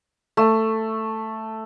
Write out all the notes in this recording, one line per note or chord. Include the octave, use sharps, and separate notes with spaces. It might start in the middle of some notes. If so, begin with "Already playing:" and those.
A3